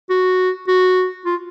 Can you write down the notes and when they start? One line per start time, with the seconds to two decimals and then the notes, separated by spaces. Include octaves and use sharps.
0.10 F#4
0.68 F#4
1.25 F4